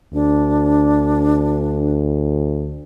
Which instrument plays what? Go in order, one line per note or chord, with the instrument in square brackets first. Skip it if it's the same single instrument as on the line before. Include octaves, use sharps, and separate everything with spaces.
[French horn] D2 [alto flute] D4